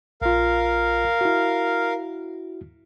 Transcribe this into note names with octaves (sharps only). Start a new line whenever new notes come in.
A#1 F4 A#4 F5
E4 F#4